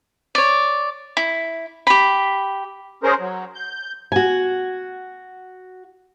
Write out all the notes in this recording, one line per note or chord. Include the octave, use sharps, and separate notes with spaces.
C#5 D5
E4
G4 B5
C#4 G#4 A#4 C5
F#3
G6
F#4 G#5